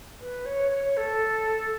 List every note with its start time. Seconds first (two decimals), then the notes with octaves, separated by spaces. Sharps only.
0.21 B4
0.46 C#5
0.72 C#5
0.97 A4